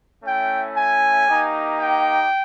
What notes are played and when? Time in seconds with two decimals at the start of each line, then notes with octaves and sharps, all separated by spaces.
0.24 A3 C#4 E4 G5
0.75 G#5
1.27 A#3 D#4 G4
1.77 G5